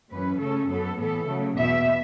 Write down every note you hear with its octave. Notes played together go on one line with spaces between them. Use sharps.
F#2 E3 C#4 B4
C#3 A3 C#4 A4
F#2 F#3 B3 A4
A2 E3 B3 A4
C#3 F#3 A3
E2 B2 B3 E5